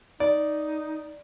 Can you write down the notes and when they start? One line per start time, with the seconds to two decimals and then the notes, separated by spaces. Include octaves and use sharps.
0.20 D#4 D5